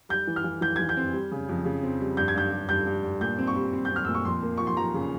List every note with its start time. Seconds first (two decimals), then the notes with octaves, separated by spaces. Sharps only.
0.09 G3 G6
0.27 E3
0.36 F6
0.44 E3
0.61 E3 G6
0.76 E3 G#6
0.89 G6
0.97 C4
1.13 G3
1.31 C#3
1.49 F2
1.65 C#3
1.83 C4
2.00 G3
2.17 G2 G6
2.28 G#6
2.35 G2 G6
2.52 G2
2.69 G2 G6
2.87 G2
3.03 G2
3.21 A#2 G6
3.38 C4
3.47 C#6
3.56 G3
3.73 C4
3.85 G6
3.91 C4
3.96 F6
4.05 A#2 E6
4.15 C#6
4.25 F2 C6
4.43 A#3
4.57 F3 C#6
4.67 C6
4.77 F3 A#5
4.94 C#3